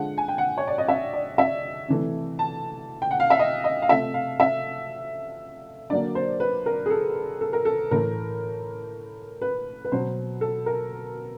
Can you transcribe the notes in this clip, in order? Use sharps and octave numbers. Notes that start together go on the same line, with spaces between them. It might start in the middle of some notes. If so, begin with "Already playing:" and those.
Already playing: D3 F3 G#3 F#5
G#5
G5
F#5
C#5
D5
D#5
E5
D5
E5
C3 E3 A3
A5
G5
F#5
F5
E5
D#5
D#5
F5
C3 F3 A3 E5
F5
E5
D3 F#3 A#3 D5
C5
B4
A#4
G#4
A4
A4
A#4
A4
A2 E3 A3 A#4
B4
B4
B2 F#3 B3 C5
A4
A#4